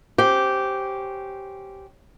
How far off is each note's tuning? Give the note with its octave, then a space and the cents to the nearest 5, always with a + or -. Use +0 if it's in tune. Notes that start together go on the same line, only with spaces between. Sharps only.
C#4 -10 G4 -10 C5 +0